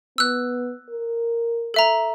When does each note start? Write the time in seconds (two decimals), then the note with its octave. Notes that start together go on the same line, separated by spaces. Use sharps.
0.18 B3 E6 F#6
0.89 A#4
1.74 A4 E5 A#5